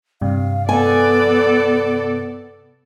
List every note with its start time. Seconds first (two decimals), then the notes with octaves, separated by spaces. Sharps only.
0.21 G2 C3 F5
0.69 B3 A4 D5 G#5